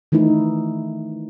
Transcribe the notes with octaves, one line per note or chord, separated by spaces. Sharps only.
D#3 E3 A3 D#4 E4